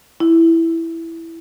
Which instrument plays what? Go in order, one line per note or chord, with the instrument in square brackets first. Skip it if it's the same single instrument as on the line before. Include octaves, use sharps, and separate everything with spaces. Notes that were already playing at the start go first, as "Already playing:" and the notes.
[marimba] E4